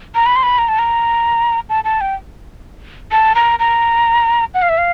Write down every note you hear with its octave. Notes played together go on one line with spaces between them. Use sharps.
A#5
B5
C6
B5
A#5
A5
A#5
A5
A5
G5
A5
A#5
A#5
F#5
F5
E5
F5